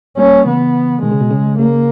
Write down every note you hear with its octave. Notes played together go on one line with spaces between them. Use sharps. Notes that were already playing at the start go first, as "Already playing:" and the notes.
G3 A#3 C#4
C#3 E3 B3
B2 D#3 G#3
C#3
B2
C#3
C#3 A#3